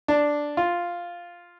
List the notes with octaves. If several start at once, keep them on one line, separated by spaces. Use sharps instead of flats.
D4
F4